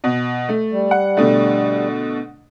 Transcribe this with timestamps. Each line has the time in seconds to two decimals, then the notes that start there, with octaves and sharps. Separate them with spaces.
0.04 B2
0.49 A3
0.72 G3
0.91 F#5
1.17 B2 D3 A3